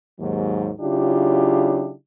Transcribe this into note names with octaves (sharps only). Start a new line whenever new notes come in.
D#2 G#2 F#3
C#3 F#3 D4 E4 F4 G4